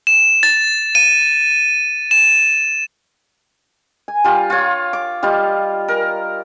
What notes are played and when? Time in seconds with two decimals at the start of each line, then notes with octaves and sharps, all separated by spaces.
0.07 E7
0.43 A6
0.95 D#7
2.11 E7
4.08 G#5
4.24 G3 F4
4.50 F4 C#5
4.93 D6
5.23 G3 F4 D#5
5.88 A#4